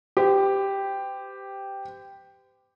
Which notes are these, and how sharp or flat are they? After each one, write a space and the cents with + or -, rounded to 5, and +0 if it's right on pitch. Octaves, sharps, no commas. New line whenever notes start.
G4 +0 C5 -45